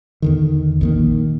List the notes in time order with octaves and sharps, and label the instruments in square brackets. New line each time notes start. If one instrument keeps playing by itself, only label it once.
[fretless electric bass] E2 D3 D#3
A#1 D#3 A#3